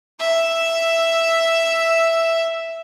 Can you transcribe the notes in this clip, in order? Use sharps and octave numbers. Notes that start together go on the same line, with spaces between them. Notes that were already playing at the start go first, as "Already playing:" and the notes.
E5 E6